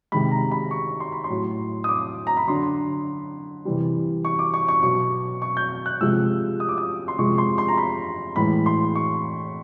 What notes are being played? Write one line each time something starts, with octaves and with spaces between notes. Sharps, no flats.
C3 D#3 G#3 B5
A#5
B5
C#6
C6
B5
C6
A2 F#3
D#6
D6
A#5
B5
D3 F#3 C6
C3 E3 G3
C#6
D6
C#6
C#6
B2 F#3 C#6
C#6
G6
F#6
C3 F3 G#3 E6
D#6
D6
D#6
C6
C3 F3 G#3 C#6
C6
C6
A#5
B5
A2 E3 G#3 B5
C6
C#6